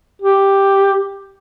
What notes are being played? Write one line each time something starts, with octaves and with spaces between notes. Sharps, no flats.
G4